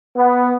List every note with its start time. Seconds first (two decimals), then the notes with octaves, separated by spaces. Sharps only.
0.16 B3